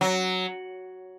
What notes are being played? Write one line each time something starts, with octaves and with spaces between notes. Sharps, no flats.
F#3